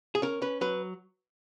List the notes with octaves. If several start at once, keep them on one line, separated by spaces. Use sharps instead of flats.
G#4
C#4 A#4
C#4 B4
F#3 B4